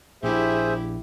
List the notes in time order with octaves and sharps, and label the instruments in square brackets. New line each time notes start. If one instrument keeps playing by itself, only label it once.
[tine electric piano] A#1 [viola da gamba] A#2 E4 G4 [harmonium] G#4 C5 E5